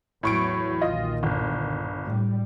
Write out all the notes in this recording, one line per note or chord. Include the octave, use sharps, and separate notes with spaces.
E2 A2 F#3 C#6 D7
B1 A#2 D#3 F4 D#5
G1
A2 G3